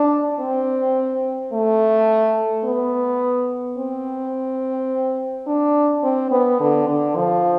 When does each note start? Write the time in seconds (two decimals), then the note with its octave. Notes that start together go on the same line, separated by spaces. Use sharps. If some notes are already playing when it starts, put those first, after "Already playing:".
Already playing: D4
0.40 C4
1.53 A3
2.65 B3
3.78 C4
5.48 D4
6.04 C4
6.32 B3
6.60 D3
6.88 D3
7.16 F3